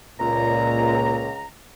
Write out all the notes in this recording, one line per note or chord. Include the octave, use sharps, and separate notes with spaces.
C#2 A#2 A#5